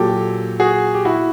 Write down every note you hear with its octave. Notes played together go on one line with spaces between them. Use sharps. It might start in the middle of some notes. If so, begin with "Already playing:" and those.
Already playing: A#2 F#3 G4 A4
F#4 G#4
G4
E4 F#4